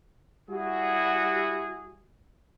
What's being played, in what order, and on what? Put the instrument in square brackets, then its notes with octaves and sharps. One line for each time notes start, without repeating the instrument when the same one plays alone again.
[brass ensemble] G3 E4 F#4 G#4